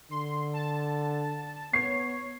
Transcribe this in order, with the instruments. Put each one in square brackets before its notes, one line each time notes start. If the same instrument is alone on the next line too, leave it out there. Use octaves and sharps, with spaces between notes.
[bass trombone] D3 [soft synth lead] C6
[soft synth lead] A5
[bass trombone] B3 [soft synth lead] C#5 [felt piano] C7